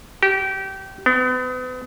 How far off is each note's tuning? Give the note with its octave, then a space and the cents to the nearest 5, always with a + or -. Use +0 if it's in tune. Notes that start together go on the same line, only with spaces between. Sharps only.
G4 -25
B3 +40